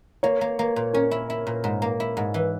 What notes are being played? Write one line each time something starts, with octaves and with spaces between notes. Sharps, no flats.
A#3 C#5
A#3
A#3
A#2
C#4 A#4
E4
E4
A#2
G#2
A#3
E4
G#2
E3